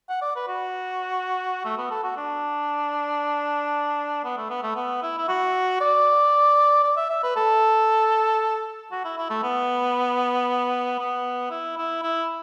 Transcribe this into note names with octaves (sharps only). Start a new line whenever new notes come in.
F#5
D5
B4
F#4
A3
B3
A4
F#4
D4
B3
A3
B3
A3
B3
E4
E4
F#4
D5
D5
E5
E5
B4
A4
F#4
E4
E4
A3
B3
B3
E4
E4
E4